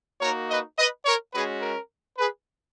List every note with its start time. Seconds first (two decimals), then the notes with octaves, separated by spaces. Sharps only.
0.20 A#3 D#4 F#4 A#4 C#5
0.49 B4 D#5
0.77 B4 D#5
1.05 A#4 C#5
1.33 G#3 C#4 F#4 G#4 B4
1.62 A#4
2.18 G#4 B4